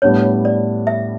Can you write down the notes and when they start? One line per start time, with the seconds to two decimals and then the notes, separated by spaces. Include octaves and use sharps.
0.02 A2 G3 B3 D4 C#5
0.45 D5
0.87 E5